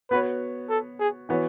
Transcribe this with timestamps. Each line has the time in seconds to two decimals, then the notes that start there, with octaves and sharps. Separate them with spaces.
0.11 B3 F#4 B4 C#5
0.70 A4
1.00 G#4
1.29 E3 B3 F#4 C#5